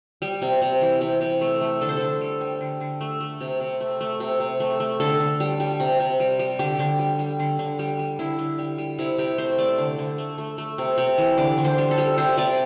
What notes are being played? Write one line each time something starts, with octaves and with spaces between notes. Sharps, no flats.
G3
C3
C3
E3
C3
C3
A3
A3
D3 A4
C5
D3 A4
G3
G3
D3
D3
A3
A3
C3
C3
A3
A3
C3
C3
A3
A3
D3 A4
D3
G3
G3
C3
C3
G3
G3
D3 G4
D3
G3
G3
D3
D3
G3
G3
D3 E4
D3
G3
G3
C3 E4
C3 G4
A3 C5
A3 D5
D3
D3
A3
A3
A3
C3
C3
E3
D3 D5
D3
C5
G3
A4
G3
C3 C5
C3 D5